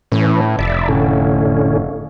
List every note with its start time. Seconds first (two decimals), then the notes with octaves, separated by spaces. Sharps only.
0.12 A2 E3 C#4
0.59 F1 D5 E5
0.89 A2 D3 C#4